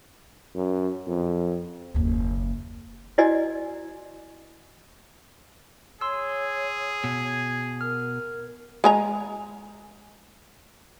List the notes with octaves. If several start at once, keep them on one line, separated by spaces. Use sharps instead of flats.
F#2
F2
F#1 D#2
E4 F#4 D5 D#5 G#5
G#4 C#5 C6 E6
B2
A#4 F6
G#3 G#5 A#5